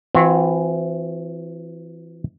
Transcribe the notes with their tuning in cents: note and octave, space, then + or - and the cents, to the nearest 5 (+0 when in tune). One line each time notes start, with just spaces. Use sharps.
E3 +15 C4 +0 F#4 -35